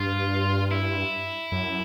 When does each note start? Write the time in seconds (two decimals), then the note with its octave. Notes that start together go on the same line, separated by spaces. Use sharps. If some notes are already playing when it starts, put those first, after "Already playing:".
Already playing: G2 F4
0.71 E4
1.52 F#2